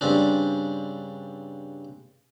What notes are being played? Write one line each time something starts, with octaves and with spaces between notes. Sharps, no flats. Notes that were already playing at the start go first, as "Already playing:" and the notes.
G2 C#3 C4 D4